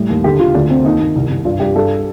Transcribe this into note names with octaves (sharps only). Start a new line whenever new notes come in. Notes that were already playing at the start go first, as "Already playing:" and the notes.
Already playing: A2 G3
D#2
D3 G4
D3 F4
D2 D4
C3 C4
D#2 D#4
D#2
C2
C2
G2 F4
G2 G4
G2 A4